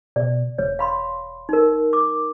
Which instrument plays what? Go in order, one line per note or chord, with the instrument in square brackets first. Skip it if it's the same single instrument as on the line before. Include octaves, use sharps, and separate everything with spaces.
[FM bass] B2 [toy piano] D5
[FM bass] E1 [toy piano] C#5
[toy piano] F5 B5 C6
D#4 A#4
D6